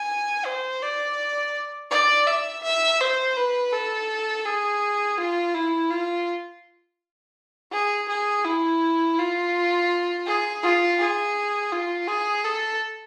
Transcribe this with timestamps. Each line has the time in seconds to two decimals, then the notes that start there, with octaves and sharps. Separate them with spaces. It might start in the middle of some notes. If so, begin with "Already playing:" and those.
Already playing: G#5
0.46 C5
0.82 D5
1.91 D5
2.27 E5
2.64 E5
3.00 C5
3.37 B4
3.73 A4
4.45 G#4
5.18 F4
5.55 E4
5.91 F4
7.72 G#4
8.09 G#4
8.45 E4
9.18 F4
10.26 G#4
10.63 F4
10.99 G#4
11.72 F4
12.08 G#4
12.44 A4